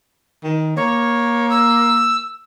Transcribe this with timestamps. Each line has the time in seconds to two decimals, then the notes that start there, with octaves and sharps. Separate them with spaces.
0.44 D#3
0.76 A#3 C#5
1.50 E6